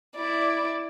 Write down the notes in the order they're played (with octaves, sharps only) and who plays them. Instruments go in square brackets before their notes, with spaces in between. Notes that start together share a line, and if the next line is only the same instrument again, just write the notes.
[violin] E4 D5